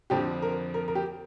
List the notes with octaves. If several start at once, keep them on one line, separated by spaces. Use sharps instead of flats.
F2 D3 F3 C4 G4
A#4
A#4
A#4
G4